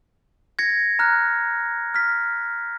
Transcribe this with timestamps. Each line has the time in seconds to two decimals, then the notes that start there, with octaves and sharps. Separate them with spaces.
0.59 G#6 A#6 C#7
0.99 A#5 F6 F#6
1.94 F6 B6